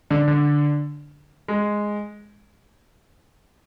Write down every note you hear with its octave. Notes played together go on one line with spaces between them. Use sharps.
D3 D4
D3 D4
G#3